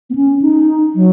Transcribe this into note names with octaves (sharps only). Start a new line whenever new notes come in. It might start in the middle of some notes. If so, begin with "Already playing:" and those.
B3
C#4
D#4
F#3